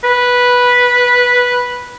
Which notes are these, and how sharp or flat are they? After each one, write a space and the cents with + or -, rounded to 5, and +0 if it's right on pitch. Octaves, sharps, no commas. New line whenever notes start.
B4 -10